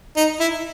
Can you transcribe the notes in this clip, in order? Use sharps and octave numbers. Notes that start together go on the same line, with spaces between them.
D#4
E4